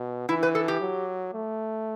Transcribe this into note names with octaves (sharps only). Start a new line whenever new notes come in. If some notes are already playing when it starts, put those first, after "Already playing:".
Already playing: B2
E3 E4
B4
A4
G4
F#3
A3